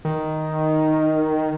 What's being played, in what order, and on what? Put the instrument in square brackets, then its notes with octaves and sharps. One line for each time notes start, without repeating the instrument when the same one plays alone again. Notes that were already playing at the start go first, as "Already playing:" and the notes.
[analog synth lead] D#3